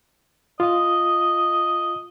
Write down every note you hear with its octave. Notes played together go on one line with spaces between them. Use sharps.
F4 D#5 F5